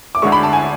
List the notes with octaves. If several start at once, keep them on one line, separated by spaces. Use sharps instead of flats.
D6
D2 D3 G#3 C#6
B5
A5
G#5